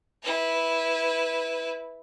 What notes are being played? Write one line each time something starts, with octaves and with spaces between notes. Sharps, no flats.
E4 B4